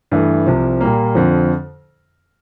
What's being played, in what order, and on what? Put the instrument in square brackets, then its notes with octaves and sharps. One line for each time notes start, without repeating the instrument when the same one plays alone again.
[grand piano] G2 E3 A3
C2 C3 F3
A#2 G3 A#3
F2 D3 F3